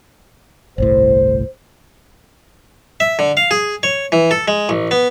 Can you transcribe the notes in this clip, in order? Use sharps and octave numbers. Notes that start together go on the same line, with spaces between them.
G1 C2 A2 C5
E5
D3
F5
G#4
C#5
E3
A4
G#3
A1
B3